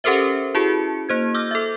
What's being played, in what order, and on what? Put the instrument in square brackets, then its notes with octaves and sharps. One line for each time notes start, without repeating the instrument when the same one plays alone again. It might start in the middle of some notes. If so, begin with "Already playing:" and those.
[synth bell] C#4 G4 A4 A#4 C5 E5
E4 F#4 G#4 A5 C#7
A#3 C5 G#6
D6 E6 F6 G6 A#6
A4 E5